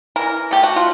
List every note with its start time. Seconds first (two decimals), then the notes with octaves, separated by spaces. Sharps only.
0.16 E3 A#4
0.51 A3 G4
0.63 F#4
0.76 F4